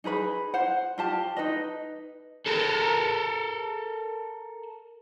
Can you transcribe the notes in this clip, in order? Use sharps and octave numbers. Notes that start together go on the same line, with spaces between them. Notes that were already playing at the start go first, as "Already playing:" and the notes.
D#4 G#4 B4 B5
C5 F#5
F4 G4 A5
D#4 B4 D#5
A4 A#4